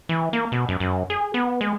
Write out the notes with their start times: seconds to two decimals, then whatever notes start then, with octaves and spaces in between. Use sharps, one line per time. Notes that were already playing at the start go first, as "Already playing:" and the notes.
0.09 E3
0.33 A#3
0.52 B2
0.69 F#2
0.80 F#2
1.10 G#4
1.34 B3
1.61 G#3